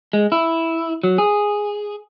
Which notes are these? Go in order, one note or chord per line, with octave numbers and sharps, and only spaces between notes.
G#3
E4
F#3
G#4